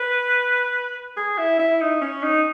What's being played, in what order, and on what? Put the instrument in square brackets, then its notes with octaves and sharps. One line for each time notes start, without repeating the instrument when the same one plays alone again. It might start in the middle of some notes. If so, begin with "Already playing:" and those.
Already playing: [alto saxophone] B4
G#4
E4
E4
D#4
C#4
D#4